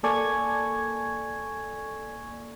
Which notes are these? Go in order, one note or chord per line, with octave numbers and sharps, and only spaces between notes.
A#3 A4 D5 G#5 C#6 G#6